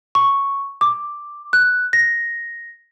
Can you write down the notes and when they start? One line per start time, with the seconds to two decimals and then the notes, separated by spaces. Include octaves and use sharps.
0.15 C#6
0.81 D6
1.53 F#6
1.93 A#6